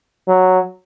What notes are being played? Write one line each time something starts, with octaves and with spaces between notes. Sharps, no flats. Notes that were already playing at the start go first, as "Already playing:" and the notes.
F#3